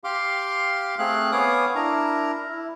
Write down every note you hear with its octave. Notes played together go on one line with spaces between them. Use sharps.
G4 F5 C6 D6
A3 C4 G#4 F5 F#6
B3 C#5 F5 G#5 D6 D#6
D4 E4 A#4 A#5
E4